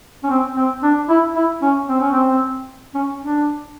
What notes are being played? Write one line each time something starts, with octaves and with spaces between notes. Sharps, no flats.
C#4
C4
C4
D4
E4
E4
C#4
C4
C#4
C4
C#4
D4